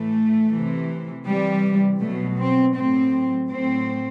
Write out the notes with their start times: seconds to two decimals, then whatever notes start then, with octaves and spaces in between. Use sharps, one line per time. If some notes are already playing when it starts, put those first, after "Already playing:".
Already playing: A2 E3 A3
0.51 C3 E3
1.26 C3 E3 G3
2.00 B2 F#3 A3
2.38 C4
2.74 A2 F#3 C4
3.50 A2 F#3 C4